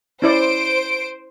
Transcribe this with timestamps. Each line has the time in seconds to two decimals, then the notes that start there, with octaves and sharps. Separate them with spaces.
0.22 C#4 E4 C5 D5 D7